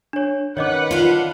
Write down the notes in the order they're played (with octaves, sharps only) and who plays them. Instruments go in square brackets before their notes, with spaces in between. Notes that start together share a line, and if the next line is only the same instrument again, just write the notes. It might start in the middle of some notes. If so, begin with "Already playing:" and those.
[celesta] D4 C#5
[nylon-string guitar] D#3 C#4 [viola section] B4 F#5 [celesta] C#5 D#5 D6
[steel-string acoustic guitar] D4 F4